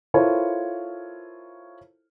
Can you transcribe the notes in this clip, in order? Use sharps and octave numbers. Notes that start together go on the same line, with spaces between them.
E4 F4 A4 A#4 C5 C#5